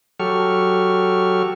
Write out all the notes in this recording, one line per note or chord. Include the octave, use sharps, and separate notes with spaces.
F#3 G4 A4 C#6 F6